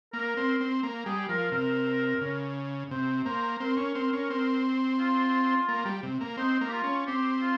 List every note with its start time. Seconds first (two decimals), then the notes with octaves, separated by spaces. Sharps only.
0.13 A#3 A#4
0.37 C4
0.60 C4
0.83 A#3
1.06 G3 G#4
1.29 F3 A#4
1.52 C3 A#4
2.21 C#3
2.91 C3 C5
3.25 A#3 C5
3.60 C4 A#4
3.77 C#4
3.95 C4
4.13 C#4
4.30 C4
4.99 F4
5.68 A#3
5.85 G3
6.03 C3
6.21 A#3
6.37 C4 D#4
6.61 A#3
6.69 G4
6.72 F4
6.84 C#4
7.07 C4 G4
7.41 F4